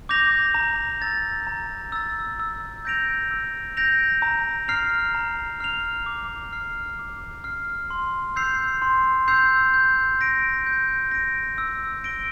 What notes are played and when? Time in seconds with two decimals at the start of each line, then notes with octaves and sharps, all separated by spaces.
0.09 D6 G6 A#6 F7
0.54 A#5
1.02 E6 A6
1.47 A#5
1.92 E6 A6
2.39 E6
2.85 G6 A#6 D7 F7
3.31 E6
3.77 G6 A#6 D7 F7
4.22 A#5
4.68 F6 C7 F7
5.15 A#5
5.60 F6 C7 F7
6.06 D6
6.53 F6 C7
6.99 D6
7.44 F6 C7
7.90 C6
8.36 E6 G6 C7 F7
8.82 C6
9.28 E6 G6 C7 F7
9.74 G6
10.21 A#6 D7
10.66 G6
11.11 A#6 D7
11.58 E6
12.04 A#6 D7 G7